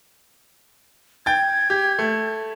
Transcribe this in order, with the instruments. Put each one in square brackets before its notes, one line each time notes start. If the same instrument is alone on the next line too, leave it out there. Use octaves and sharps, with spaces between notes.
[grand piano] G5 A6 [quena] G#6
[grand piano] G4
A3